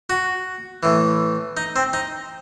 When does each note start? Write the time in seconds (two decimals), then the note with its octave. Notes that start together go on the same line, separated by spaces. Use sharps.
0.10 F#4
0.83 A2 E3
1.57 D#4
1.76 C4
1.93 D#4